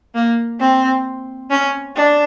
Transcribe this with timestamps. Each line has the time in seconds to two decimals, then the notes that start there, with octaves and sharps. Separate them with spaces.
0.15 A#3
0.60 C4
1.50 C#4
1.96 D4